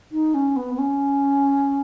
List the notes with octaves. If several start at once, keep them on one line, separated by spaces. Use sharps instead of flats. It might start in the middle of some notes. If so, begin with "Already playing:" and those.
D#4
C#4
B3
B3
C#4